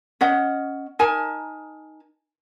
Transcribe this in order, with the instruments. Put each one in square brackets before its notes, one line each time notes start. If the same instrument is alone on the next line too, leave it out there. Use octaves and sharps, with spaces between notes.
[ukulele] C#4 C#5 D#5 F#5
D#4 A#4 G#5 A5